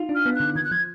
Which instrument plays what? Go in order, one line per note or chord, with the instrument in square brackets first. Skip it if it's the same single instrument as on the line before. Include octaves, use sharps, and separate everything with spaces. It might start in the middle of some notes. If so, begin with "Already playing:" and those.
Already playing: [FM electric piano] D#4 F4
D4
[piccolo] F6
[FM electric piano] B3
[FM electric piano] D3 [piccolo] F#6
[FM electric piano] D#3 [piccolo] G#6
[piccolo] F#6
[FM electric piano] F3 [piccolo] G#6